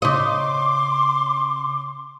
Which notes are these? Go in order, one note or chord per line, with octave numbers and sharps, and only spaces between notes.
C#3 D#5 C6 D6